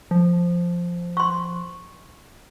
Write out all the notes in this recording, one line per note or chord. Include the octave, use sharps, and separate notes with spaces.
F3
C6 C#6